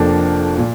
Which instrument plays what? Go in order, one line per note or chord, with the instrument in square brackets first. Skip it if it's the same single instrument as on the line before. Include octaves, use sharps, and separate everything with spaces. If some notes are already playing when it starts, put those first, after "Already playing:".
Already playing: [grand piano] F1 F2 F3 A#3 D4
A#2